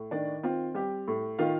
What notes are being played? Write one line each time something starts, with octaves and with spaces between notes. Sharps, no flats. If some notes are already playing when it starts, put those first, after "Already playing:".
Already playing: A2
D#3 D4 D5
C4 F4
G3 G4
A2
D#3 F4 F5